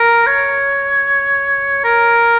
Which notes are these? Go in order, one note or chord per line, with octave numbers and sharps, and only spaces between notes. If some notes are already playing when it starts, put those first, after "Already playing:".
Already playing: A#4
C#5
A#4